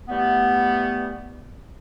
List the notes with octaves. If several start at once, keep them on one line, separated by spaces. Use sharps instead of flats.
E3 G3 A3 B3